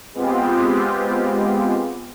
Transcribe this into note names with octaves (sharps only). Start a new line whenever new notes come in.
G#3 B3 C4 F4 G4